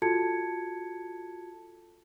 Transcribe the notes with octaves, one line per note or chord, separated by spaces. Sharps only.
F4 F#4 A4 A5 G#6 C#7